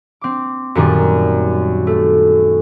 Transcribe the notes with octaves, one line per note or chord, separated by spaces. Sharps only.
C4 D6
F#2 A#2 D#3 G3
A3